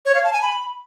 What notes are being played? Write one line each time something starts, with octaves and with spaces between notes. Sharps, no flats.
C#5
F5
A5
G#5
B5